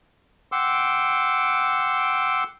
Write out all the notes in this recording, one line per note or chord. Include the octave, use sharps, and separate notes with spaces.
F#5 G5 C6 D6 E6